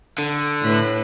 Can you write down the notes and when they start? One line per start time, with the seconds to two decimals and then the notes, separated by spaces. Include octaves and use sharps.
0.18 D3
0.61 A2 B4